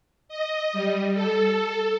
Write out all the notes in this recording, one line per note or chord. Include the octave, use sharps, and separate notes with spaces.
D#5
G3
A4